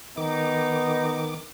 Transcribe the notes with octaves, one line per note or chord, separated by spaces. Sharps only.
D#3 B3 D#4 D6